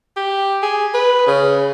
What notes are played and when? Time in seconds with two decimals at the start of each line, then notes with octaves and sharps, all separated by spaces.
0.17 G4
0.63 G#4
0.94 B4
1.27 C#3